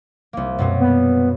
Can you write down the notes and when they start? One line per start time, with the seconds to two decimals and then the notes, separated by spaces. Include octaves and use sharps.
0.33 C2 A#3
0.58 F#2 B2 C4
0.80 B3